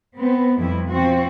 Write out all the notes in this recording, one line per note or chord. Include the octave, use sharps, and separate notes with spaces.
B3 C4
F2 B2 G3 E4
F3 C4 F#4